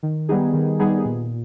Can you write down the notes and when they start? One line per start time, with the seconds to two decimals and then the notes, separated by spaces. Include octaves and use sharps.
0.03 D#3
0.29 G3 B3 D#4 G#4
0.53 D#3
0.79 G3 B3 D#4 G#4
1.05 A#2